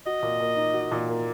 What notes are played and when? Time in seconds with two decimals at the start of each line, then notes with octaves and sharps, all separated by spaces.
0.06 F#4 D#5
0.23 A#2
0.40 A#3
0.57 D#4
0.74 F#4
0.91 A#2
1.09 A#3